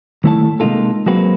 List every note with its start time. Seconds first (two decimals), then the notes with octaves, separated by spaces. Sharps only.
0.24 D#3 A3 E4 C#5 F#5 A5
0.60 C3 G#3 A#3 D#4 F4 A4
1.06 F#3 G#3 A#3 C4 F#4 B4